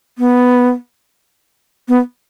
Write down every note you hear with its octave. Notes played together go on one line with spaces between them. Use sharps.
B3
B3